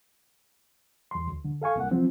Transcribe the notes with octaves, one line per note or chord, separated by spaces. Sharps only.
E2 C6
D2
D3
A4 F5 G#5 C#6
C2 A#3 F#5
F3 C4